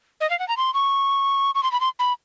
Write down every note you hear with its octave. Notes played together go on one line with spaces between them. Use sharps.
D#5
F5
F#5
A#5
C6
C#6
C#6
C6
B5
C6
B5